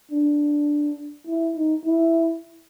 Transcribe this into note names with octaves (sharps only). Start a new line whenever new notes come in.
D4
E4
D#4
E4